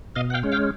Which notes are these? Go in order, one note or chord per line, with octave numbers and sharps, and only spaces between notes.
B2 D#5 F5
F#5
F5 G5
G#3 C#4
F5 G5